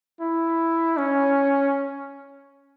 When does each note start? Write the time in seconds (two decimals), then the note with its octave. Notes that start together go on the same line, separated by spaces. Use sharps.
0.21 E4
0.97 C#4